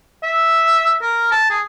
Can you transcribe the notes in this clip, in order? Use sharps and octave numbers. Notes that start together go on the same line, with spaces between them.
E5
A#4
A5
G#4